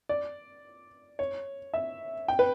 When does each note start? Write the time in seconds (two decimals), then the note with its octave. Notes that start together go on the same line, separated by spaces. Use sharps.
0.09 D5
1.19 C#5
1.74 E5
2.28 G5
2.39 B4